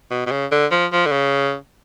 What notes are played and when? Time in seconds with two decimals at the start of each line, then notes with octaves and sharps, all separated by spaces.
0.11 B2
0.26 B2
0.31 C#3
0.52 D3
0.71 F3
0.92 F3
1.06 D3
1.12 C#3